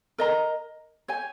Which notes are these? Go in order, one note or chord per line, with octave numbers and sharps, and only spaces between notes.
A#4 D#5 A#5
G4 C#5 G#5